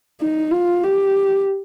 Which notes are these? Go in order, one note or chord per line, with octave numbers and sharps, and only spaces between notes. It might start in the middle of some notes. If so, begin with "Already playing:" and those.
D#4
F4
G4